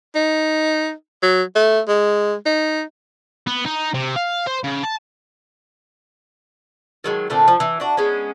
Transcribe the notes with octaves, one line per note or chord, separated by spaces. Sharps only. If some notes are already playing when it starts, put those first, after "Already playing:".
D#4
F#3
A3
G#3
D#4
B3
D#4
C3
F5
C5
C#3
A5
D#3 F#3 G#3
A#2 D3 A3 C4
F3
E3
D4 F#4
G#3 B3 C#4